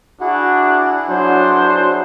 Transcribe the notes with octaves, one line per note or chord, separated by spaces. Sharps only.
D4 E4 F#4 G#4 F#5
F#3 D4 C5